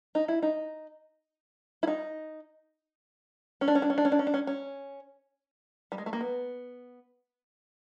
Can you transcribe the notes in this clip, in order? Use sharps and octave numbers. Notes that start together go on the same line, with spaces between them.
D#4
E4
D#4
E4
D#4
C#4
D4
C#4
D4
C#4
D4
C#4
D4
C#4
D4
C#4
C#4
G3
G#3
A3
A#3
B3